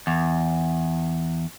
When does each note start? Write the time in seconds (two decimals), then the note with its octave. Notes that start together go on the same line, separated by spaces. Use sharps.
0.07 E2